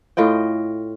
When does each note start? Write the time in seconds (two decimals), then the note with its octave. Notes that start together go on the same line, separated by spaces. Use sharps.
0.17 A2 F4 D#5 G5